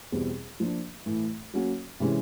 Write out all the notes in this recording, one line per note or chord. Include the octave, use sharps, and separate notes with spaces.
E2 B2 G3 C4
F3 A#3 D4
A2 E3 A3
F#3 A#3 C#4 F#4
C3 E3 G#3 C#4